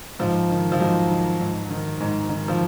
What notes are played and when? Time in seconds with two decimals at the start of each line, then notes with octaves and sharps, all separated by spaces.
0.19 G#2 F3
0.50 D#3
0.72 F3
0.80 G#2 F#3
1.10 D#3
1.39 G#2
1.70 D#3
2.00 G#2
2.29 D#3
2.48 F3